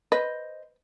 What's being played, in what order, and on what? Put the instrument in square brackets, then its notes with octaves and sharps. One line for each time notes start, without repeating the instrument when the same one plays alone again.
[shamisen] B4 [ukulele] C5 D#5